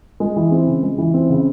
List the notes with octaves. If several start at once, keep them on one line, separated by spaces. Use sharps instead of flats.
G#3
E3
C4
C#3
G#3
E3
C4
C#3